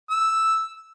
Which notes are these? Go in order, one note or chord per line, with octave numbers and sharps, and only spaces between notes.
E6